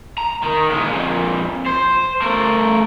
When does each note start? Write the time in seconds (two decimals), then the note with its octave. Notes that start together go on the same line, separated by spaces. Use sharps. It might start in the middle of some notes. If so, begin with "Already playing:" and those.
0.18 A#5
0.43 D#3
0.70 A#2 G#3
0.88 F2 A#2
1.66 C5
2.21 A3 A#4